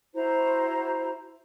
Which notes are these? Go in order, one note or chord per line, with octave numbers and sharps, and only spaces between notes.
E4 F#4 C5 A#5